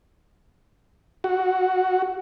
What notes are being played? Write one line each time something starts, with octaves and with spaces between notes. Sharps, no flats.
F#4